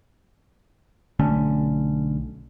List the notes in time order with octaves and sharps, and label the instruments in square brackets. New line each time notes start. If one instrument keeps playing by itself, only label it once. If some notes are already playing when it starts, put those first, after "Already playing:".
[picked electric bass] B1 D3 A3 C#4